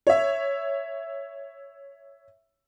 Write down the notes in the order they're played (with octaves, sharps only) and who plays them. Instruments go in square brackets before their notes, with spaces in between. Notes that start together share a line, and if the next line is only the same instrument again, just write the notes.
[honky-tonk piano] C#5 E5